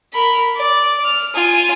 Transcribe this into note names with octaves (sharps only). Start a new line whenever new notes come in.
A#4 B5
D5
F6
F4 G#5